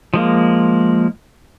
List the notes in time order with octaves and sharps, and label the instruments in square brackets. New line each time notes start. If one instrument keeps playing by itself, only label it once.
[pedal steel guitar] F3 G#3 A#3